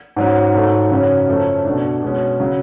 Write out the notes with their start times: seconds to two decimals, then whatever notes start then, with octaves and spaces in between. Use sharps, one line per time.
0.16 G#2 F#3 C#4
0.54 G#2 F#3 A3
0.91 F#2 C#3 F#3 C#4
1.28 F#2 F3 A3 C#4
1.65 B2 A3 D4
2.02 B2 G#3 C#4
2.40 C#3 F#3